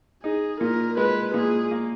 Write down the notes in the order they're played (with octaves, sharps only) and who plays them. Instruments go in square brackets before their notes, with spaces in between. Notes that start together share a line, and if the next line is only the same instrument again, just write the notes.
[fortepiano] D#4 [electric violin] G#4
[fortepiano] A#2 [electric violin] A#4
[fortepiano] G#3 [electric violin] B4
[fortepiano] A#2 [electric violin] G#4
[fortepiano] A#3